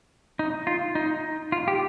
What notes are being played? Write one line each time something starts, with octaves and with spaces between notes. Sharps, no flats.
D#4
F4
D#4
F4
G4